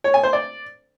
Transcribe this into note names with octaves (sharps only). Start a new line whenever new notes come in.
C#5
G#5
C5
D5